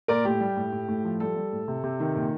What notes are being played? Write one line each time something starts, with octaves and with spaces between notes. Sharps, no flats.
A#2 A#4 D5
A2 G4
G3
A2
A2
A2
F3
G3 A4
G3
A2
C3
C3
D#3
A#2